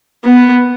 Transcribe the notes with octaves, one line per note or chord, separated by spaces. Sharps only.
B3